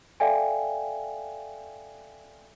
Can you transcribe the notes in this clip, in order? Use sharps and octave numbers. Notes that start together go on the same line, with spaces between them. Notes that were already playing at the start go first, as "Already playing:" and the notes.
A4 D5 E5 F5 G5 G#5